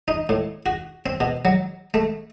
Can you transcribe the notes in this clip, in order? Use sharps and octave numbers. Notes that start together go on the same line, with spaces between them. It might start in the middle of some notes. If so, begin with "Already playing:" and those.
D#4
A2
F#4
C4
B2
F#3
A3